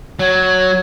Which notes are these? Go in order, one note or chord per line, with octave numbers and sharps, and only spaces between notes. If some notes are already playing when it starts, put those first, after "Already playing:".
F#3 C#5